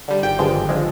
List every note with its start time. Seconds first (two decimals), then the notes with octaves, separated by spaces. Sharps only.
0.08 D3 G3
0.23 G#1 G5
0.39 G2 D3 F3 G#3
0.54 G#1
0.69 D3 F3 G#3